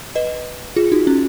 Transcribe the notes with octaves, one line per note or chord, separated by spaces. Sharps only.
B4 D#5
F4 G#4
D#4 F#4
C#4